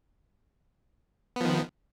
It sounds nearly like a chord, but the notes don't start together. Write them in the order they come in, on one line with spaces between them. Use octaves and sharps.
B3 F3 D#3